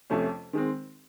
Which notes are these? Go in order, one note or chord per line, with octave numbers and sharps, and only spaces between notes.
F2 C3 F3 A3 C#4
D#3 G#3 C4